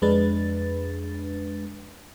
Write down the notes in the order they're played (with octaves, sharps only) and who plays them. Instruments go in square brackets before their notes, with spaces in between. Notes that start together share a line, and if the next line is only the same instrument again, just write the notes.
[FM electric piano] F2 G#3 D4 B4 A6